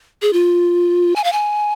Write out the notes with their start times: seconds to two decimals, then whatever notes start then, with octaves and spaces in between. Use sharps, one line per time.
0.22 G#4
0.33 F4
1.16 G#5
1.24 F5
1.32 G#5